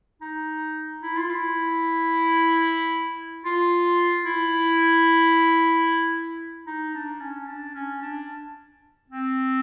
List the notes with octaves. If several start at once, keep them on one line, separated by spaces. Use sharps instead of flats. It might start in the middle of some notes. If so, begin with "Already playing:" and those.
D#4
E4
F4
E4
F4
E4
D#4
D4
C#4
D4
C#4
D4
C4